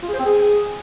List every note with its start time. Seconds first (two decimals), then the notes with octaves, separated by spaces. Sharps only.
0.03 F4
0.08 G#4
0.14 C5
0.19 C4
0.25 G#4